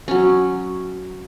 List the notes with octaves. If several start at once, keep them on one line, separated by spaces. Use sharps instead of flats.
F#3 C#4